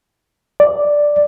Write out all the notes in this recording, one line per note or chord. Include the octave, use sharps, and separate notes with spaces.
D5